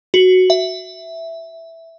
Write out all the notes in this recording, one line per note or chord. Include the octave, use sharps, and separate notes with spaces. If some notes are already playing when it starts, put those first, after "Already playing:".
F#4
E5